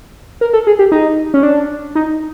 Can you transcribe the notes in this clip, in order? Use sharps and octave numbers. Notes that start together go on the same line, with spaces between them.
A#4
A4
G#4
G4
D#4
C#4
D4
D#4